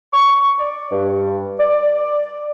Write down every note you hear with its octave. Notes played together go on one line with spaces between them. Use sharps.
C#6
D5
G2
D5